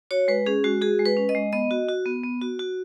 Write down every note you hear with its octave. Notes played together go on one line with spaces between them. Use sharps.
F#4 C#5
G#3 B4
C#4 G#4
G#3 F#4
F#4 G#4
G#3
B4
C#4
D#5
G#3
B3 D#5
F#4
F#4
B3
B3
F#4
F#4